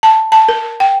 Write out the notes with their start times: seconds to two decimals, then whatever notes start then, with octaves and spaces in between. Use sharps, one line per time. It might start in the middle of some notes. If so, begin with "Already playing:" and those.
0.03 A5
0.32 A5
0.49 A#4
0.80 G5